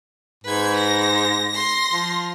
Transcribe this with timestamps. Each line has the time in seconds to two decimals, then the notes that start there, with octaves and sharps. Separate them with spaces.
0.44 G#2 B4 G#6
0.77 A#6
1.50 C6 A#6
1.93 F3